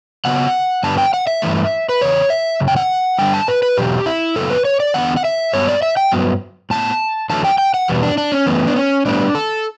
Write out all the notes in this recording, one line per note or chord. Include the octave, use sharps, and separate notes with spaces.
C#3 F#3 B3 F#5
G2 D3 G3 B3 A5
G5
F#5
E5
G2 E3 A3
B4
E2 C#3 C#5
E5
F#2 C#3
G5
F#5
G2 D3 G3 G5
A5
B4
B4
E2 B2 F#3 G4
E4
F#2 C#3 F#3 B3 A4
B4
C#5
D5
E2 D3 G3 B3 F#5
F#5
E5
G2 F#3 B3 C#5
D5
E5
G5
G2 F#3 B3
A2 G3 A5
B3
E2 D3 F#3 A3 A5
G5
G5
F#5
E2 B2 G3 B3
D4
D4
C#4
F#2 E3 A3 B3
D4
C#4
A2 G3 B3 D4
A4